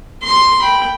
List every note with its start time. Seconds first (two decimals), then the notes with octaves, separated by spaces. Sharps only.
0.23 C6
0.62 G5 B5